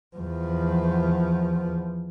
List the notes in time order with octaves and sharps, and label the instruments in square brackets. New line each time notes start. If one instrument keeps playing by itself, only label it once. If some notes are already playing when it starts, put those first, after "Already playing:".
[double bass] E2 F3